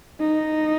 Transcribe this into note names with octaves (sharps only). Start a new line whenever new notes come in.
D#4